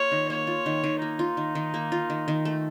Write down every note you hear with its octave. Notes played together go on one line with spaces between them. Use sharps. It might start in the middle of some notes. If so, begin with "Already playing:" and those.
Already playing: A#3 F4 C#5
D#3
A#3 C#5
F4
D#3
D#3
A#3 D#4
F4
D#3
D#3
A#3
F4
D#3
D#3
A3